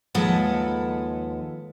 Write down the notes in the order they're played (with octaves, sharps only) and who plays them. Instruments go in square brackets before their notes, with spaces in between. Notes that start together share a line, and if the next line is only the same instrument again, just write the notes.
[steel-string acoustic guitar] D#2 F3 G#3 A4 B4 F#5